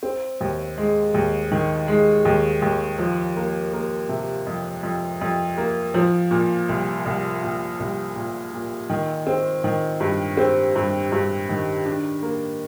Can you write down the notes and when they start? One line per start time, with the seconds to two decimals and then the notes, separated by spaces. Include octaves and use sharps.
0.03 C4
0.41 D#2
0.78 G#3
1.14 D#2
1.52 D#3
1.88 G#3
2.25 D#2
2.62 D#2
2.99 F3
3.36 A#3
3.73 A#3
4.09 C3
4.47 F2
4.83 F2
5.21 F2
5.57 A#3
5.94 F3
6.31 A#2
6.69 C2
7.06 C2
7.43 A#2
7.80 C2
8.16 A#2
8.54 A#2
8.90 D#3
9.27 C4
9.64 D#3
10.00 G2
10.37 C4
10.76 G2
11.12 G2
11.49 D#3
11.86 D4
12.23 A#3